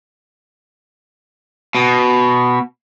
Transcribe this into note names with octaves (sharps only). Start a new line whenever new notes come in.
B2